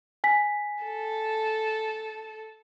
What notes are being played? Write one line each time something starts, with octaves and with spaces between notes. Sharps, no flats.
G#5 B6
A4